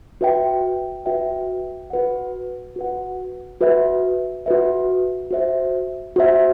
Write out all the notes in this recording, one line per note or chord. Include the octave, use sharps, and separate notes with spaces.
F#4 B4 E5 G5
F#4 B4 E5 G5
F#4 B4 F#5
F#4 B4 F#5
F#4 B4 E5
F#4 B4 E5
F#4 C5 E5
F#4 C5 E5